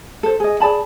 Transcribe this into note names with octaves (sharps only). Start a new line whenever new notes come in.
A4 C5
G#4 D#5
G#4 D5 A5 B5